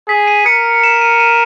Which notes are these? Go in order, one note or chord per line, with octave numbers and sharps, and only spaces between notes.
G#4 B6
D#7
A#4 C#7
E7
D#7
D#7